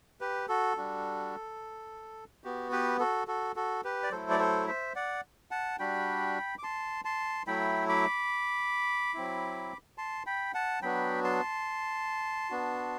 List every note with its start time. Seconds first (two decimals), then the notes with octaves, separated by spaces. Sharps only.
0.21 G4 B4
0.48 F#4 A4
0.77 G3 D4 F#4
2.44 B3 F#4 G4
2.72 G4 B4
3.00 F#4 A4
3.27 F#4 A4
3.56 F#4 A4
3.84 G4 B4
4.03 D5
4.11 F#3 A3 E4 A4 C5
4.30 D5
4.39 A4 C5
4.68 C5 E5
4.96 D5 F#5
5.51 F#5 A5
5.79 G3 D4 F#4 G5 B5
6.59 D6
6.63 A5 C6
7.05 A5 C6
7.47 F#3 A3 E4 G5 B5
7.89 B5 D6
9.14 F#3 C4 E4
9.98 A5 C6
10.26 G5 B5
10.54 F#5 A5
10.82 F#3 B3 D4 F#4 G5 B5
11.24 A5 C6
12.50 B3 D4 F#4